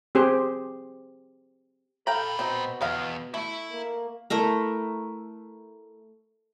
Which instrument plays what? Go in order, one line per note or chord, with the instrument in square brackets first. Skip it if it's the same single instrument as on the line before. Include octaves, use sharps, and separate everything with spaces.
[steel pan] C4 G4 G#4 C5
[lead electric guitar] A#2 B5 [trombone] A4 [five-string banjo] F5 G5 A#5
[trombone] B2 [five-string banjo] C4 D#4
[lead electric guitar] E2 [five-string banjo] B4 D#5 F5
[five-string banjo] A3 [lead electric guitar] E4 E5
[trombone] A#3
[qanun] A3 E4 A#4 A#5